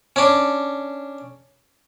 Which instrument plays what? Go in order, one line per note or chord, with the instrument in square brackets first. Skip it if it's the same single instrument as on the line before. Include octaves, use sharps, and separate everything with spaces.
[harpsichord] C#4 D4